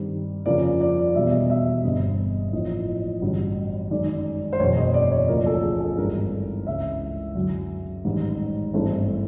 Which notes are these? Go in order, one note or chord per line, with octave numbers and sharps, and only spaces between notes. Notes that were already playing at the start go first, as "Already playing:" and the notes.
Already playing: G2 D#3 G3 C4
F2 C#3 F3 A#3 D5
D5
E1 E2 B2 G3 E5
D#5
E5
D#5
G1 G2 D3 G3 C4 D#5
A1 A2 F3 A#3 D#5
A1 G2 D3 F#3
F#2 D#3 G#3 D5
C5
F#1 E2 B2 C#5
D#5
D5
C#5
D2 C#3 F3 A#3 A#4
A4
G#4
A4
G#1 G2 E3 A#4
C#2 C#3 E3 E5
F#2 D3 F#3
A1 G#2 D#3 G3
G#1 G2 E3 A3 C4